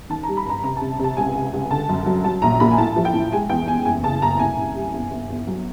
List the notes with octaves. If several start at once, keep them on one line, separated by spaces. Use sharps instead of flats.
D#3 A5
A#5
G3
B5
G2 A#5
C3 A#5
A5
C3
C3 A5
C#2 G#5
C3
C#2
D3 A5
F#2
F#3
F#3 A5
A#1 A#5
A#2 B5
G#5
A2 A5
F3
G5
A2
G#3 G#5
E2 G5
E2 G#5
F#1 G#5
C#3 A5
F#1 A#5
C2 G#5
C2
G3
G1
G1
G1
F#3